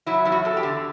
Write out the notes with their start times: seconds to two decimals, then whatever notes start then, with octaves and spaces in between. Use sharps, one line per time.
0.06 F#3 E4
0.25 E2 E4
0.32 F#4
0.45 E2 A4
0.57 G4
0.63 D3